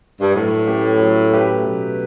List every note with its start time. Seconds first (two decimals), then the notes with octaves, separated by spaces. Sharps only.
0.20 G2
0.33 A2 F#3
0.66 A3 C#4 G4 B4
0.98 F#3
1.31 A3 C#4 G4 B4
1.63 B2 F#3